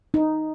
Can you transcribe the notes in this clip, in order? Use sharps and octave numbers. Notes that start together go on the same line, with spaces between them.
D#4